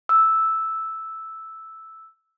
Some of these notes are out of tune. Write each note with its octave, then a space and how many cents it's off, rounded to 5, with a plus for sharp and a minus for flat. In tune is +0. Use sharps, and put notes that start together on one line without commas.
E6 -5